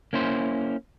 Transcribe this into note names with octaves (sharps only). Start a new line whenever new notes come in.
A#3 C#4 E4 C5